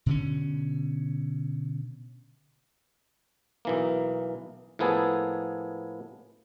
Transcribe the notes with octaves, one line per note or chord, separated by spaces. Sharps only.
B2 D3 C#4
B1 E3 A#3
A2 F3 A#3 B3 G#4 A4